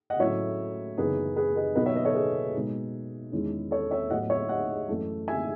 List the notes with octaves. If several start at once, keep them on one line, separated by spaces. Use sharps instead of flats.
D#5 F#5
A2 F#3 A3 C#4 E4 C#5 E5
F#2 C#3 E3 B3 D#4 G#4 B4
G#4 B4
B4 D#5
B2 F#3 B3 D#4 B4 D#5
C#5 E5
B4 D#5
A4 C#5
G#4 B4
B2 G#3 D#4
E2 D#3 G#3 C#4 E4
A4 C#5
C#5 E5
A2 F#3 B3 E4 D#5 F#5
C#5 E5
D#5 F#5
F#2 E3 A3
E5 G#5